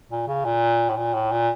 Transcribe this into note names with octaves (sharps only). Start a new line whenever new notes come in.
A#2
C#3
A#2
A2
A#2
A2
A#2